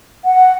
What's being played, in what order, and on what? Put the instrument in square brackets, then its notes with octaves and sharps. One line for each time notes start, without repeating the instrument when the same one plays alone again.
[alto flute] F#5